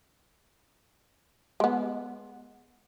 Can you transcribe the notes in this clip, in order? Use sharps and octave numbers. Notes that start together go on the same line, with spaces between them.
G#3 B3